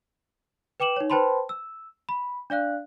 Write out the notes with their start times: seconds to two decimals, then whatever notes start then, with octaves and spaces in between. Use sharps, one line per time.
0.80 B4 G5 D6 E7 F#7
0.96 D#4 C#5
1.10 B4 C5 G5 A5 B5 C6
1.49 E6
2.09 B5
2.50 D4 D5 F5 F#6